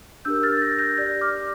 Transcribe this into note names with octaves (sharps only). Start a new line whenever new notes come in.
D4 G4 A#4 E6 G6
F6 A6
A6
G6 A#6
G6 A#6
G4 D5 G6 A#6
D6 F6